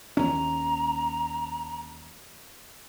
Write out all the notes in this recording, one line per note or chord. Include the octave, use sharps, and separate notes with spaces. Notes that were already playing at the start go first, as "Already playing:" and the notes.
D#2 C#4 A#5